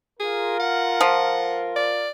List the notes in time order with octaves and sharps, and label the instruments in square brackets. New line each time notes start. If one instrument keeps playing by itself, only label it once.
[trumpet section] F4 A#4 [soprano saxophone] G#4
[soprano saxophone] F#5
[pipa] F3
[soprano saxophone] D5